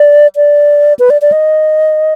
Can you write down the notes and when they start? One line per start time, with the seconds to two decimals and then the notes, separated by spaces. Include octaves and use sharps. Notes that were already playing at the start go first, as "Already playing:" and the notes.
Already playing: D5
0.36 D5
0.99 B4
1.10 D5
1.22 D5
1.32 D#5